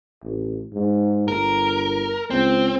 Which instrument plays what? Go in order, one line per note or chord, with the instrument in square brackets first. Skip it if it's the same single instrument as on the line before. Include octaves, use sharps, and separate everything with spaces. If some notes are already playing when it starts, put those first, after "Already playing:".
[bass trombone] A1
G#2
[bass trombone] G1 [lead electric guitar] A#4
[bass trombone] C#2 [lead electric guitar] C4